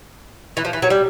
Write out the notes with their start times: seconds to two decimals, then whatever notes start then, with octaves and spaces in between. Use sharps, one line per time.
0.57 E3
0.65 F3
0.73 E3
0.82 F#3
0.90 G3